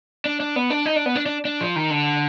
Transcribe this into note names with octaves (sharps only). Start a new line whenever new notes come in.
D4
D4
B3
D4
D#4
D4
B3
D4
D4
D4
F3
D#3
D3